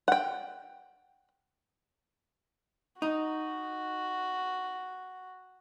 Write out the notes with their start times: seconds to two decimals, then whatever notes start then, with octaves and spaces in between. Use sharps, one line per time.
0.08 F#5 G5
3.02 D#4 F#4